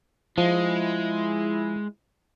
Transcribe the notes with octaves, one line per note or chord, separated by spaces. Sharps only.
F3 G#3 E4